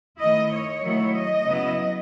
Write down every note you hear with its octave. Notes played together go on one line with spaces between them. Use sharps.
D#3 A3 E4 D#5
C#5
D#3 F#3 A3 E4
D#5
C#3 F#3 B3 E4